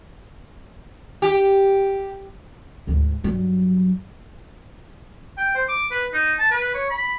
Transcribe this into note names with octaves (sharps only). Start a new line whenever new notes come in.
G4
D2 G#2
G2 F#3
G5
C5
D6
B4
D#4
A5
B4
C#5
B5